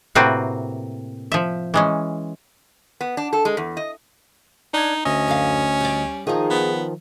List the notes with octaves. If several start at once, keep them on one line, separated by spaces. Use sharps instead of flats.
A2 C3 A#3 C4 F#4 B4
F3 E5
E3 G#3 C#4
B3
D4
A4
G#3
E2
D#5
D4 D#4 G#6
D2 C#4 D#5
F#2 D3 F5
G3 D5
D#3 F3 D#4 G#4
B3